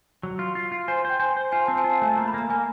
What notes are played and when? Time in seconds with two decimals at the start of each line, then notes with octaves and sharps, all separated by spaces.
0.23 F#3
0.39 F4
0.55 F4
0.72 F4
0.88 C5 G#5
1.05 C5
1.10 G5
1.20 C5 G#5
1.37 C5
1.52 F4 G#5
1.66 C4 A5
1.78 G#5
1.84 F4
1.90 A5
2.02 A3 G#5
2.17 A#3 A#5
2.28 B5
2.34 A#3 A#5
2.50 A#3 G#5